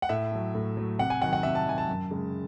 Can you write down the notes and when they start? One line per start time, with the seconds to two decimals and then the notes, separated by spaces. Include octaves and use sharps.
0.02 F#5
0.09 A2 E5
0.32 F#3 A3
0.55 A2
0.77 F#3 A3
0.99 C3 F#5
1.10 G#5
1.22 D#3 F#3 F#5
1.33 F#5
1.43 C3 E5
1.55 A5
1.66 D#3 F#3 G#5
1.78 A5
1.89 F#2
2.11 C#3 G#3